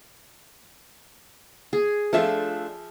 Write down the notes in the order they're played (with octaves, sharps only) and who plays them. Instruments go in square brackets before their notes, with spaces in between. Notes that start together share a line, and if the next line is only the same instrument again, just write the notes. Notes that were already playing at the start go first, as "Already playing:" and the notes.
[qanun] G#4
[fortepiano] F3 E5 [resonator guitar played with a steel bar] A3 D4 F4